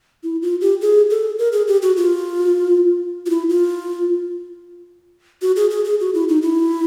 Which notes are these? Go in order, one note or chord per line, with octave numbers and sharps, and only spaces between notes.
E4
F4
G4
G#4
A4
A#4
G#4
G4
F#4
F4
F4
E4
F4
F#4
G#4
G#4
G#4
F#4
E4
D#4
E4